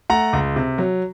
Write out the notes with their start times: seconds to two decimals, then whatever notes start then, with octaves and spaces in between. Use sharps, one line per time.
0.10 A3 F#5 A#5
0.33 C#2
0.56 C3
0.78 F#3